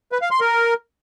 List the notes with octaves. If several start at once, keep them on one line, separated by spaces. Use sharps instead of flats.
B4
F5
C6
A#4